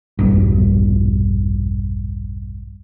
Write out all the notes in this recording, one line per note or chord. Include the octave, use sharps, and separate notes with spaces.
E1 A#1 G2